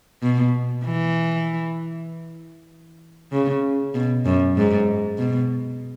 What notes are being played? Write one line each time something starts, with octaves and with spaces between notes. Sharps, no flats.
B2
E3
C#3
B2
F#2
G#2
B2